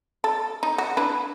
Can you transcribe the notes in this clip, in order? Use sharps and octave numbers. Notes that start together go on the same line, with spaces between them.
A4
D#4
F#4
D4 E4 B4